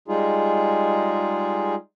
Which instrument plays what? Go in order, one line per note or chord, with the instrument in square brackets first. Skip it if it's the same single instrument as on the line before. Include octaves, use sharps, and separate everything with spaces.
[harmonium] G3 G#3 D#4 F4 G#4